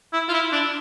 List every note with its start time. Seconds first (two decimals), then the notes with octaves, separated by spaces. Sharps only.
0.13 E4
0.29 F4
0.33 E4
0.52 D4